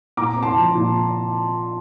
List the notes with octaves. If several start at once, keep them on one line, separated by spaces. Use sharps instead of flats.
A#2 A#5 D6
C4
A5 C6
F3
A#2